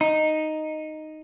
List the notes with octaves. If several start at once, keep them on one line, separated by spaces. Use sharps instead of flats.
D#4